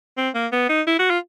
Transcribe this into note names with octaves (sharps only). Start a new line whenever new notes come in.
C4
A#3
B3
D#4
E4
F#4
F4